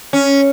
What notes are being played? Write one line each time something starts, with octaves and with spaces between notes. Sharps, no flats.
C#4